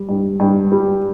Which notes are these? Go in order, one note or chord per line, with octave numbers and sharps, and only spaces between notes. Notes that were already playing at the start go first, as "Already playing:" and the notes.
Already playing: G3
G2
G2
G3